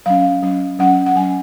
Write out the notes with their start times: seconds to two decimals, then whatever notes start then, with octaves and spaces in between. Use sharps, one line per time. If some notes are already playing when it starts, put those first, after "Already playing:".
0.06 F#3 C#4 F5
0.42 F#3 C#4
0.79 F#3 C#4 F#5
1.06 F#5
1.16 F#3 C#4 G#5